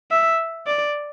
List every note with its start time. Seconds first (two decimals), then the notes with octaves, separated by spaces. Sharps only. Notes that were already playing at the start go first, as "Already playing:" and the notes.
0.11 E5
0.66 D5